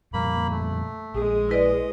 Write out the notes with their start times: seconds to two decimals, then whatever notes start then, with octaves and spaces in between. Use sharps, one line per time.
0.13 F2 A#2 G3 A#3 B5
0.51 A3
1.14 A#1 G#3 G#4
1.49 E4 B4 D5 D#5